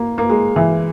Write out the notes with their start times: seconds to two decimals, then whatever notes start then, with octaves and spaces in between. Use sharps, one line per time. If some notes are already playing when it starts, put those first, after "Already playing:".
Already playing: A#3
0.18 A#3
0.29 G#3
0.56 E3